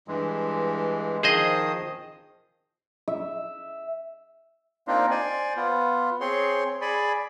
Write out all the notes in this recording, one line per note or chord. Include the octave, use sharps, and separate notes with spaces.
G2 E3 G#3
D#3 F3 G#4 C5 D#5 D#6
E5
A#3 C4 D4 D#4 F4
C5 D5 G#5
B3 F4
C4 G#4 C#5 C6
G#4 D5 G#5 B5